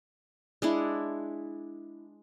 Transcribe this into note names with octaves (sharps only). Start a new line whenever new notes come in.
G#3 D4 E4